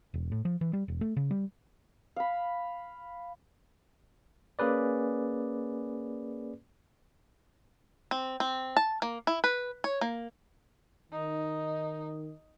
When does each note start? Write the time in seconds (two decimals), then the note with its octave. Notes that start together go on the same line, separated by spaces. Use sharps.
0.14 E1
0.32 A2
0.45 F3
0.61 E3
0.73 G3
0.88 E1
1.01 A3
1.17 C#3
1.31 G3
2.16 F5 B5
4.59 A#3 C#4 G#4 B4 D5
8.11 C4
8.40 C4
8.77 A5
9.02 A#3
9.27 E4
9.44 B4
9.84 C#5
10.01 A#3
11.12 D#3 D#4